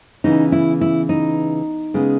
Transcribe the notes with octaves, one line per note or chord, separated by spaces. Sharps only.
C#3 E3 B3 D#4
E4
E4
D#4
C#3 G#3 B3